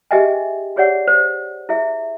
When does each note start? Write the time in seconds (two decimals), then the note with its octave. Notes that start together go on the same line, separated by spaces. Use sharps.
0.11 G4 G#4 D#5 E5 G5 G#5
0.76 G4 G#4 C#5 D5 F#5
1.07 C5
1.69 E4 G#4 E5